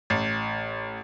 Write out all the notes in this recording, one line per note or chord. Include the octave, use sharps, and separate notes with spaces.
A1